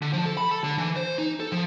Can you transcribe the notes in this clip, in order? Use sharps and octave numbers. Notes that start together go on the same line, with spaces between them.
D3
F3
A4
B5
A4
D3
E3
C5
D#4
A4
F3